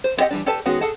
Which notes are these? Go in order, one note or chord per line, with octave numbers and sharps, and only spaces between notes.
C5
B3 C4 G4 D#5 F#5
E3 G3 D4
G4 A4 B4 D5 A5
D#3 G#3 B3 C#4 F#4
G#4 A4 F#5 A5